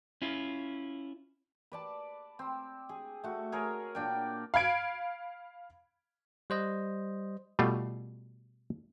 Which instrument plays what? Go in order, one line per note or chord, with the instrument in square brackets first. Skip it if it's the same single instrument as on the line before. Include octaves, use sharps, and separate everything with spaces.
[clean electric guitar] C#4 E4 F4
[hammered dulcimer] B4 D5 A5
C4
G#4
A3 F#4
G#4 A#4 C#5
A#2 D4 G5
[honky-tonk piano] F5 B5 G#6 D7
[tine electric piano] G3 C5 D#5
[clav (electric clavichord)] B2 G3 A3 F4